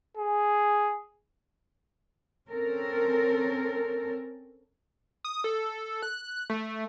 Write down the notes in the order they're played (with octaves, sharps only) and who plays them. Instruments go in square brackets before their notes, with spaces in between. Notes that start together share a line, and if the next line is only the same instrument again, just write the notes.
[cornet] G#4
[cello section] C4 C#4 A4 A#4
[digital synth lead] D#6
A4
F#6
A3